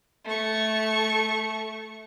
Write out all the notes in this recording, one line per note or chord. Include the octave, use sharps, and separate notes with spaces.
A3 C#6